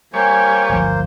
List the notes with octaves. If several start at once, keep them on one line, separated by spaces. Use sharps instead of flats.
G3 A#3 C5 C#5 G#5
D1 G1 F3